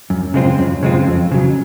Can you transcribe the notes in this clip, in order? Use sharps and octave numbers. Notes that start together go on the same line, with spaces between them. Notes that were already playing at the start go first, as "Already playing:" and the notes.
F#2
C#3 G#3 C4 F4
F#2
C#3 G#3 C4 F4
F2
C#3 F#3